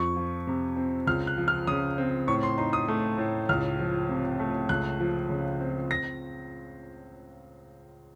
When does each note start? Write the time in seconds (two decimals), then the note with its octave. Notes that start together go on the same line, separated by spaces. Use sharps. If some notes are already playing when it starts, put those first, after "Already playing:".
Already playing: F2 C#6
0.16 F3
0.47 C3
0.77 C4
1.07 C#2 F6
1.27 F#6
1.37 F3
1.48 F6
1.67 C#3 D#6
1.98 C4
2.27 A2 C#6
2.43 C6
2.58 D#4 C6
2.73 D#6
2.88 A3
3.18 A2
3.49 C#2 F6
3.79 F3
4.09 C3
4.39 A3
4.69 C#2 F#6
5.00 F3
5.30 C#3
5.60 C4
5.91 A#6